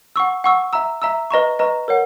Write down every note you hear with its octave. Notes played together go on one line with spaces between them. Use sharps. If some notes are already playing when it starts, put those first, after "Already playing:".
F#5 C#6 E6
F#5 C#6 E6
E5 A#5 E6
E5 A#5 E6
B4 D#5 A#5 C#6
B4 D#5 A#5 C#6
A#4 C#5 F#5